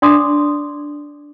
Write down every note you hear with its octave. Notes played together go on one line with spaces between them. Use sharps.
D4 D5 C6 D6 D#6